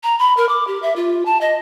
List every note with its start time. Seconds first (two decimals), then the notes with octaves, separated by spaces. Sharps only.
0.03 A#5
0.19 B5
0.37 A#4
0.49 D6
0.67 G4
0.82 E5
0.96 F4
1.26 A5
1.41 D#5